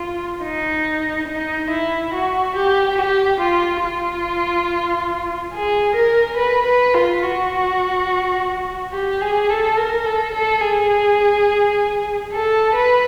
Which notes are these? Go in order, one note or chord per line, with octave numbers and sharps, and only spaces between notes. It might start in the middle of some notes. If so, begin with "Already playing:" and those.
Already playing: F4
D#4
D#4
E4
F#4
G4
G4
F4
F4
G#4
A#4
B4
B4
F4
F#4
G4
G#4
A4
A#4
A4
A4
G#4
A4
B4